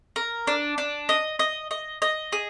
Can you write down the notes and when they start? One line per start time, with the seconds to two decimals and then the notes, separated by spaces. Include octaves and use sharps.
0.16 A#4
0.47 D4
0.78 D4
1.09 D#5
1.39 D#5
1.71 D#5
2.02 D#5
2.32 G#4